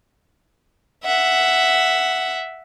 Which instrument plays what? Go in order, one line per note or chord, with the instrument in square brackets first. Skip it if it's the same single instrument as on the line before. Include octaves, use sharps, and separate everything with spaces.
[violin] E5 F#5